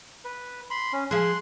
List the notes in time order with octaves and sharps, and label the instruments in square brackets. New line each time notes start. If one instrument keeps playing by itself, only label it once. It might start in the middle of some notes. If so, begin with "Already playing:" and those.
[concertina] B4
B5 C6
C#4
[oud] F3 G#4 [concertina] C6 F#6